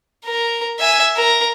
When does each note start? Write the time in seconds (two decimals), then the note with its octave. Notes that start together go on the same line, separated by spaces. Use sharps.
0.25 A#4
0.80 E5 G#5
1.16 A#4